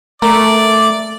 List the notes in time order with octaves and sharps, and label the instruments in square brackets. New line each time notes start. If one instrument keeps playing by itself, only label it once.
[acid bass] A3 [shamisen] A#4 [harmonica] D5